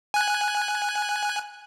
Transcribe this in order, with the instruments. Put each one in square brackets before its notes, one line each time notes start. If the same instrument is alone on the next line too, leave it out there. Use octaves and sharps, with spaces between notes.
[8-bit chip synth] G#5 F#6